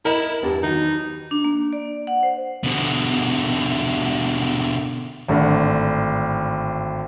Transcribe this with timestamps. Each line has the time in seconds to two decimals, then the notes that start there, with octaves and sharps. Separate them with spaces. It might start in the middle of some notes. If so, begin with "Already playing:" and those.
0.05 E4 A#4 D#5 E7
0.43 E2 G2 G3
0.63 D#3 F#3 D#4
1.31 D4
1.44 A#3
1.73 D5
2.07 F#5
2.23 C5
2.64 B2 D3
5.28 G#1 A2 D3